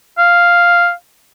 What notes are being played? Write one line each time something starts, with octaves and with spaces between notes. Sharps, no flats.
F5